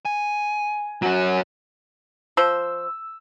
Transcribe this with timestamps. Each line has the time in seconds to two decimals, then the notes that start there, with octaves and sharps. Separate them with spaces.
0.05 G#5
1.02 F#3 C#4
2.37 F3 C5 E6